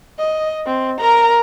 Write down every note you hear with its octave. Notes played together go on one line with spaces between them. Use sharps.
D#5
C4
A#4 A#5